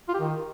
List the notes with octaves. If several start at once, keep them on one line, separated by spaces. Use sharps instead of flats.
F4
G4
D#3